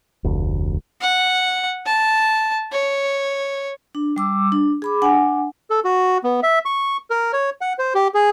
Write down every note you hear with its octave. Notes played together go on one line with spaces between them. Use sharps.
F1 D2
F#5
A5
C#5
D4
G3 D6 E6
D4
G#4 B5 D6
D4 F#5 G#5
A4
F#4
B3
E5
C#6
A#4
C#5
F#5
C5
G4
G#4